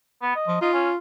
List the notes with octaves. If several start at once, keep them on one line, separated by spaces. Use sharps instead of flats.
B3
D#5
F3
D#4 F4
C#4